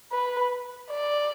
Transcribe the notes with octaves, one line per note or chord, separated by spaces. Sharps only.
B4
D5